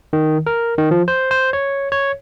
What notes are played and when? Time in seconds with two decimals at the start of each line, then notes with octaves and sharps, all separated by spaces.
0.13 D#3
0.46 A#4
0.78 D#3
0.91 F3
1.08 C5
1.31 C5
1.53 C#5
1.92 C#5